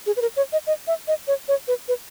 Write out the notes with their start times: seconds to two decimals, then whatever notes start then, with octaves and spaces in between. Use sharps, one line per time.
0.06 G#4
0.16 B4
0.22 A#4
0.36 C#5
0.52 D#5
0.67 D#5
0.87 E5
1.08 D#5
1.27 C#5
1.48 C#5
1.68 B4
1.88 B4